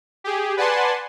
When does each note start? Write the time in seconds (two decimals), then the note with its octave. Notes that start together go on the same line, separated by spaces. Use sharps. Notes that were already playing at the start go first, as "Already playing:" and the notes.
0.24 G4 G#4
0.57 B4 D5 F#5 G#5 A5 C6